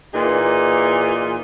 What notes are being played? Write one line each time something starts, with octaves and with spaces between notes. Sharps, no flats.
A#2 E3 D#4 G#4